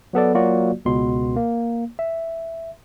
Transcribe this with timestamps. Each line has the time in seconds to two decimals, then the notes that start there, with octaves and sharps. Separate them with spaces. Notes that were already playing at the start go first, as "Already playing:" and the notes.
0.13 F#3 B3 A4 D5
0.34 F#3 A#3 F4 F#4 D5
0.85 C#2 B2 C6
1.36 A#3
1.99 E5